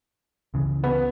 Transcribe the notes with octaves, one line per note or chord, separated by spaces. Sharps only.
C#2 C#3 E3
B3